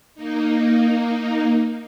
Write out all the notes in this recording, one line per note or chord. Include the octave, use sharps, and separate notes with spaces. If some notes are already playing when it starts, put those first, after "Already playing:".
A#3 D#4